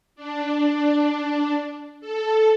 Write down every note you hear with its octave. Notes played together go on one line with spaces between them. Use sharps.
D4
A4